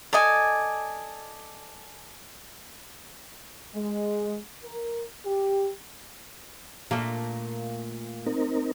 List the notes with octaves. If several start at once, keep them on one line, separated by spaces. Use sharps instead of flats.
A4 D5 D#5 G#5
G#3
A#4
G4
A#2 A3 A#3 D4
C4 D#4 A#4